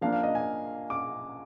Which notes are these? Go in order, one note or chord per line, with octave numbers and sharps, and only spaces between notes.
F3 A#3 D4 F5
F5
D#5
G#5
D6